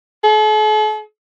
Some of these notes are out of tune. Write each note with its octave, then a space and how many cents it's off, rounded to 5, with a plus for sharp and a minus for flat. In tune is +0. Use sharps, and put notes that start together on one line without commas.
A4 -45